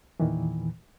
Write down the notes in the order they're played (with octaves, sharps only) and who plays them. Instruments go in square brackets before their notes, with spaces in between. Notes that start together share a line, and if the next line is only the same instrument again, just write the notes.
[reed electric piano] E2 A#2 D#3 E3